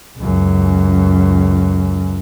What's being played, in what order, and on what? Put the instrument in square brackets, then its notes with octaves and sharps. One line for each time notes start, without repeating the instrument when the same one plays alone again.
[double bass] C#2 F#2